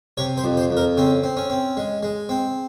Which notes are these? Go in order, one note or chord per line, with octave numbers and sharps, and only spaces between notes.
C3 C#5
C5
F2
C5
F2
A#4
C#3 C4
C4
C#4
C4
G#3
G#3
C4